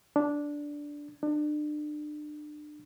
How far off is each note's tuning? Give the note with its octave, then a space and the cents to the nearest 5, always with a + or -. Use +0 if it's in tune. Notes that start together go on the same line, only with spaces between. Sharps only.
D4 -5
D4 +35